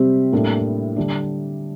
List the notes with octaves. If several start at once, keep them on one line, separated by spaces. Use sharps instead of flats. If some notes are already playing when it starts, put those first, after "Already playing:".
Already playing: C3 G3 C4 G4 C5
A2 G3 A#3 D4 A4
D3 G3 D4